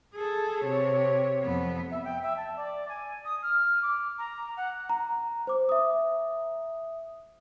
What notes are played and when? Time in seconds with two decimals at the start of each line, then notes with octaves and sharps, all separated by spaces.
0.14 G#4 A4
0.63 C3 C#5
1.42 F2 B3
1.91 E5
2.05 G5
2.22 E5
2.37 A5
2.56 D5
2.88 G#5
3.25 D#6
3.42 F6
3.82 D6
4.18 A#5
4.57 F#5
4.89 A#5
5.47 C5 D6
5.69 E5 D#6